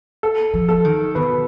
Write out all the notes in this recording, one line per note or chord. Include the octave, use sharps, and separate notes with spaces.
A4
F3
A4
D#3
B2 B4